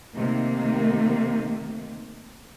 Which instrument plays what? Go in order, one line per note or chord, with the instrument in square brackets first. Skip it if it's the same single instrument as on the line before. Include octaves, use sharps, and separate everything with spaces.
[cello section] C3 D#3 A3 A#3